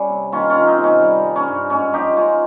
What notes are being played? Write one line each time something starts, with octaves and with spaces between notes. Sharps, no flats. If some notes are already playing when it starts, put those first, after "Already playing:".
Already playing: G3 C#4
C3
D#3 C#4 F4
C#4 F4
D#3
C4 D#4
C3
C#4
G3
G3
C#4
G2
G#2 C#4
F3 D#4 G4
G#3 C#4 F4